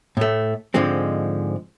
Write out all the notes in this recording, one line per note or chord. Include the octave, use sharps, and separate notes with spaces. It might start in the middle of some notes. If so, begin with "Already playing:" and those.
A2 A3
G#2 D3 F3 G#3 C4